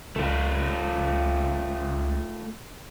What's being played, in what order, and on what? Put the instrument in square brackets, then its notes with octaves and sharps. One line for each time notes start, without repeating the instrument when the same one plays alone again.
[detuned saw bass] C#2 [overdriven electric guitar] A3 F4